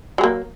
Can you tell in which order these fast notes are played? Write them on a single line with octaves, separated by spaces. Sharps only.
F#3 G#3 A#3